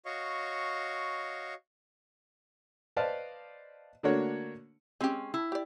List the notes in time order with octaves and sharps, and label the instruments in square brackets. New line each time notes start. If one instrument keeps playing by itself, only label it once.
[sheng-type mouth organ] F#4 C#5 D#5 F5 C#6
[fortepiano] B4 C5 D5 D#5 F5 A5
D3 A3 A#3 D4 F#4 C#5
[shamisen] G#3 G4 [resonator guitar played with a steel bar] C4 C#4
[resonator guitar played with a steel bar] E4
[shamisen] G4 D5